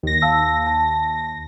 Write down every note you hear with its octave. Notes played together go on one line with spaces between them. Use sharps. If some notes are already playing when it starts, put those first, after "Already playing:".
D#2 A#6
F5 A5 E6
A5